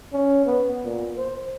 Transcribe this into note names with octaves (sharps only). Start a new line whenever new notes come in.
C#4
B3
A#2
C5